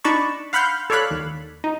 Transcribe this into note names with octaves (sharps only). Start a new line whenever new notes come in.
D4 D#4 D5 A5 B5 C#6
F5 F#5 B5 C6 F6 G6
A4 C#5 D5 F5 B5 F#6
D#2
D#4